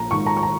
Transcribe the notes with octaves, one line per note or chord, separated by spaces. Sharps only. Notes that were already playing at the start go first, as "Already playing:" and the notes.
Already playing: A#1 A#5
G#2 D#3 C#6
A#5
C#6
A#5